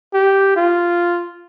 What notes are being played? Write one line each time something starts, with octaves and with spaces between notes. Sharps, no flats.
G4
F4